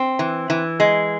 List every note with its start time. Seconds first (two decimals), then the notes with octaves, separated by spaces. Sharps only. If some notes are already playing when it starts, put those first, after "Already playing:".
Already playing: C4
0.19 E3
0.50 E3
0.80 G#3